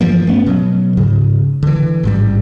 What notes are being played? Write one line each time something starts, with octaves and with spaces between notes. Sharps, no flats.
G2 E3 F3 A#3
A3 B3 C#4
B2 F#3
G#2 C#3
D3 E3
A1 G#2 G3